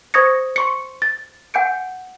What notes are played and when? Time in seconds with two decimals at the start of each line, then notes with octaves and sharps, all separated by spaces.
0.14 C5 C#6 D#6 G#6 A#6 C#7
0.56 C6 C#6 C#7
1.02 A6
1.54 F#5 G#5 G6 C#7 D7